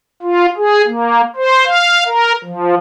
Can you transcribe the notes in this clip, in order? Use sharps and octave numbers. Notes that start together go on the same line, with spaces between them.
F4
G#4
A#3
C5
F5
A#4
F3